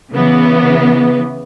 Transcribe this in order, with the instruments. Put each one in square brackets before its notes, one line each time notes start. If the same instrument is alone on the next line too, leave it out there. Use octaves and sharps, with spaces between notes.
[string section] C#3 E3 B3